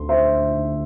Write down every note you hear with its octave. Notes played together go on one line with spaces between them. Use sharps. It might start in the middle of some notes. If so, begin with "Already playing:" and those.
Already playing: D2 D3 C6
C5 E5